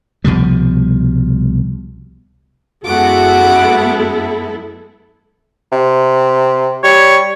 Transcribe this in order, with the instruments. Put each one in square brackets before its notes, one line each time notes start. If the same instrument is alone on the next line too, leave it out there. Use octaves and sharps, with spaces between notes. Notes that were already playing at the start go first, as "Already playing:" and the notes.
[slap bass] C2 B2 F3 G3
[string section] F#2 G#3 B3 [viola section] E4 A4 [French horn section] F#4 [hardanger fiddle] F#5 D6
[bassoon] C3
[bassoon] G3 [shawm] C#5